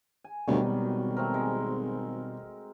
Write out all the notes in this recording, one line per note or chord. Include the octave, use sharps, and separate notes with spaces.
G#5
D2 B2 D#3 F#3 G3
G#1
A3 C4 A#4
G#3